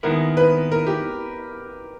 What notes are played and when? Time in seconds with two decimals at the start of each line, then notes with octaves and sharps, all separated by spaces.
0.03 D#2 D#3 G#3 B3 E4 A#4
0.37 B4
0.72 A#4
0.87 G4